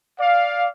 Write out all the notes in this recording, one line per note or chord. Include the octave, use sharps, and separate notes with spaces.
D5 F5